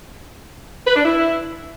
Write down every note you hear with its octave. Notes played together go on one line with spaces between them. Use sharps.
B4
D4
E4